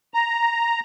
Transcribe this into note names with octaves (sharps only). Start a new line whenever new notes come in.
A#5